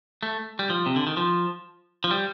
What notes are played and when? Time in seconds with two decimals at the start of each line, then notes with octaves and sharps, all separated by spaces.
0.23 A3
0.59 G3
0.70 F3
0.86 C3
0.96 D3
1.07 D#3
1.17 F3
2.04 F3
2.11 G3